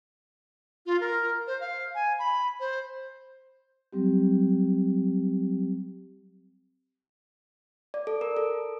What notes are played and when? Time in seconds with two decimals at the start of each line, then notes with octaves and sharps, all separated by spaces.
0.86 F4
1.01 A#4
1.47 C5
1.60 F5
1.95 G#5
2.19 B5
2.60 C5
3.93 F#3 G3 C4 G4
7.94 D5
8.07 A4
8.21 A#4
8.37 A4